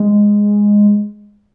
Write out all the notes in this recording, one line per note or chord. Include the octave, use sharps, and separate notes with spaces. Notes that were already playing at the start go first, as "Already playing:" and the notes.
Already playing: G#3